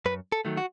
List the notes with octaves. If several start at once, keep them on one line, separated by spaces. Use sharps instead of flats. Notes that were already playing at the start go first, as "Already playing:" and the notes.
F#2 B4
A4
D#3 F#3 A3
F#4